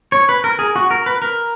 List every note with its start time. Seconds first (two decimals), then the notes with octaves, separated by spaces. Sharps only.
0.12 C#5
0.29 B4
0.44 A#4
0.59 G#4
0.76 F#4
0.91 A#4
1.06 B4
1.22 A#4